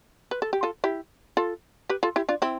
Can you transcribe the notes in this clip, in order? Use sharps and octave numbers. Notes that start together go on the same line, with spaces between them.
B4
A4
G4
F4 A4
E4 G4
F4 A4
G4 B4
F4 A4
E4 G4
D4 F4
C4 E4